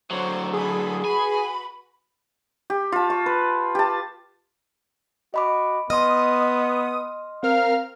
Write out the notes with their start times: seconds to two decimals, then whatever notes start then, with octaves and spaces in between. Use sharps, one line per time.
0.11 D3 F#3 C5 C#5
0.54 G#4 A4 G#5 B5
1.05 F#4 B4 G#5 B5
2.70 G4
2.92 F4 A5
3.10 C#6
3.26 B4
3.75 G4 A5
5.34 F#4 D#5 B5 D6
5.90 B3 D#5 C6 D#6 F6
7.43 C4 A#4 F5 F6